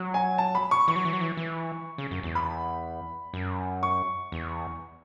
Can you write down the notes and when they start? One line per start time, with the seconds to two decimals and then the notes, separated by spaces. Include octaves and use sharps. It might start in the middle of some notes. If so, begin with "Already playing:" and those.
Already playing: F#3
0.14 G#5
0.38 A5
0.55 B5
0.71 C#6
0.88 E3 C#6
0.96 F#3
1.05 E3
1.13 F#3
1.21 E3
1.37 E3
1.98 C#3
2.11 F#2
2.23 E2
2.35 B5
3.34 F#2
3.83 C#6
4.32 E2